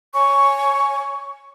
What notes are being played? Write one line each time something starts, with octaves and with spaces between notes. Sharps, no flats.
C#5 G#5 C#6